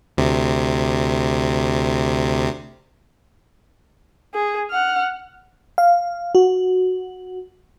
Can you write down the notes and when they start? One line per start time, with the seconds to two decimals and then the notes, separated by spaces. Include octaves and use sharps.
0.17 D2 C3
4.34 G#4
4.71 F#5 F6
5.78 F5
6.35 F#4